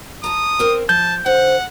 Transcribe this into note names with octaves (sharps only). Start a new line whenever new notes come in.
A5 A#5 D#6
C4 A#4 C5
F3 A5 G6
D3 C5 F#5